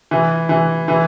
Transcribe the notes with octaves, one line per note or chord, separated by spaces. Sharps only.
E3
E3
E3